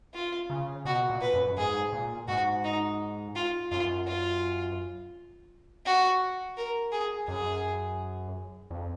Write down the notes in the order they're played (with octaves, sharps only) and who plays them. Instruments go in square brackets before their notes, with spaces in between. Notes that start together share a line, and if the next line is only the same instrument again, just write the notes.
[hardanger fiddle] F4
[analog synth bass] C#3
[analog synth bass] B2 [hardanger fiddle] F#4
[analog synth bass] A#2
[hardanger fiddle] B4
[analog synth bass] F#2
[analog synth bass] G#2 [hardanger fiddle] G#4
[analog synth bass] A#2
[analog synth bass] G#2 [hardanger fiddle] F#4
[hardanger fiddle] D#4
F4
[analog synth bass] F#2 [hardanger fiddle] F4
[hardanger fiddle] F4
F#4
A#4
G#4
[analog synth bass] F#2 [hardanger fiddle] G#4
[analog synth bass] F2